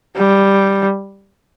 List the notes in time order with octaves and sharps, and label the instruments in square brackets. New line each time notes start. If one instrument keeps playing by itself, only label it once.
[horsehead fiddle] G3